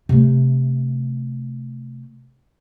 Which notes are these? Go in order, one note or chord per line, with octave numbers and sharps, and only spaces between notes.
C3 A3